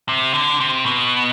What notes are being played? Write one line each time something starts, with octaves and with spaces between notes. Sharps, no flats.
C3
D3
C3
B2